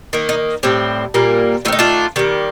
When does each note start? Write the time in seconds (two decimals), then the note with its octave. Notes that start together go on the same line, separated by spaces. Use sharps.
0.13 D#3 A#3
0.29 D#4
0.63 A2 G3 C4
1.14 A#2 G3 A#3
1.65 D#3 A3 C4 F4
1.72 D#4
1.79 D4 F4
2.16 D#3 G3 A#3